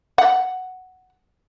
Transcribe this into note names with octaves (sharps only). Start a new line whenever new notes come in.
F#5